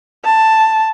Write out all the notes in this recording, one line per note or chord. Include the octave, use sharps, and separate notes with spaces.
A5